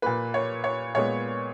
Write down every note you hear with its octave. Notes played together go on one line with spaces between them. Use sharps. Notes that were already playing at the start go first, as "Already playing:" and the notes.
A#2 A#3 B4
C#5
C#5
A#2 G#3 B3 C#5